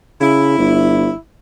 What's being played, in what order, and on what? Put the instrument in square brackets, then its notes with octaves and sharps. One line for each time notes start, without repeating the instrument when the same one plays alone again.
[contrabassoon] C#3 [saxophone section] E4
[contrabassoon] G1